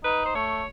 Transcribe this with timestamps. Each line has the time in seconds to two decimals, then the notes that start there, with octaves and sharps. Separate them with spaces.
0.04 D#4 B4
0.25 C5
0.35 A3 C#5